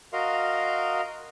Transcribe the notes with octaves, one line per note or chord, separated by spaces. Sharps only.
F#4 A#4 D#5 F5 A#5 C6